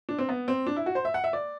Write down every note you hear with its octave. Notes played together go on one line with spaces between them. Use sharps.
D4
C4
B3
C4
D4
E4
F#4
C5
E5
F#5
E5
D5